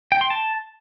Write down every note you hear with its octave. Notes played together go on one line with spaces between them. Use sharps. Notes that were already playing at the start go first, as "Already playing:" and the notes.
G5
C6
A5